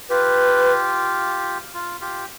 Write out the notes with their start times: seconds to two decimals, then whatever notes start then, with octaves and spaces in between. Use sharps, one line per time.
0.09 F4 G4 B4
1.74 F4
2.01 F4 G4